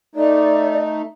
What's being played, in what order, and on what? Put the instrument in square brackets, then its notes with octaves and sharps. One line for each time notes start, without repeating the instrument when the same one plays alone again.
[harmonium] A3 D#4 [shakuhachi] D5